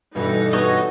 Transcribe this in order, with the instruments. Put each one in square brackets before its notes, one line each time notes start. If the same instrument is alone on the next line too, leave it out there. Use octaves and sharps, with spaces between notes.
[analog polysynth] G2 B2 E3 [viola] D#4 A4
[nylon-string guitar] B3 [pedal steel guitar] F#4 C#5 D#5